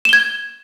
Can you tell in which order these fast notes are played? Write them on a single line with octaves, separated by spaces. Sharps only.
E7 G7 G#6